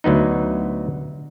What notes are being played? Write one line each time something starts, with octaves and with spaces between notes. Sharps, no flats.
D2 F#3 B3 D#4